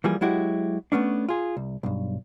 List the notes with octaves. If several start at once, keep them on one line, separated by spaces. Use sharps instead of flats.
E3 F3 G3 A#3 G#4
F#3 G#3 E4 F#4 G4
A3 B3 C#4 D4
F4 G#4
C2
B1 G2